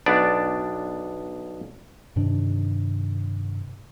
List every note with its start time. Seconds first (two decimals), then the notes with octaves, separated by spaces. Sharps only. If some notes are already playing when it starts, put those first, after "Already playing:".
0.06 B1 B3 D4 D5
2.16 G2 C3 D#3 D4